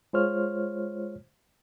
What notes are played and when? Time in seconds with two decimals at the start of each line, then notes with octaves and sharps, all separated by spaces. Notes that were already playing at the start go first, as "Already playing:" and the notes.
0.13 G#3 F4 C5 C#5 F6